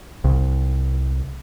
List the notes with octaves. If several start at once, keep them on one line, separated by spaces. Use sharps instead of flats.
C2